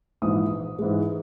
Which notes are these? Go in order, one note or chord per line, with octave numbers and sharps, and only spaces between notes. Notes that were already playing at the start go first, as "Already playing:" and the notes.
A#1 G#2 E3 D#6
G#2 E3 G#3